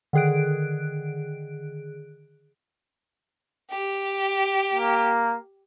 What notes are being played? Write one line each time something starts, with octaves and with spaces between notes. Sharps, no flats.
D3 D#3 G#4 F#6 D7
G4
A#3